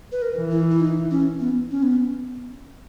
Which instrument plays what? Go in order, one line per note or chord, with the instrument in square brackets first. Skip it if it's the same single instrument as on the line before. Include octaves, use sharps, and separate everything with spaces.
[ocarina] B4
A#4
[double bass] E3
[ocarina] E4
E4
D#4
C#4
B3
C#4
B3